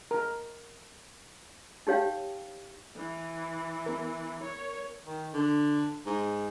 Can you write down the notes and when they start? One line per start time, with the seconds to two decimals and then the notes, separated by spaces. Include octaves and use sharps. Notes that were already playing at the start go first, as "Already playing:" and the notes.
0.11 A#4
1.87 D#4 G4 C#5 F5 G5
2.94 E3
3.86 B3 A#4
4.43 C#5
5.05 D#3
5.33 D3
6.06 G#2